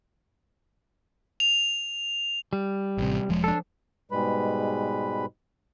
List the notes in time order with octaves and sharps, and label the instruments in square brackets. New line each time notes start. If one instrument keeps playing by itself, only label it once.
[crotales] F7
[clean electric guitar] G3
[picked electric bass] A1 C3
E1 F3 G#3
[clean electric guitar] D4 A4
[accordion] G#2 B2 G3 G#3 B4 B5